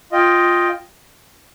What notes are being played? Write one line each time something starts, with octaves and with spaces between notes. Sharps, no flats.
F4 D#5 G5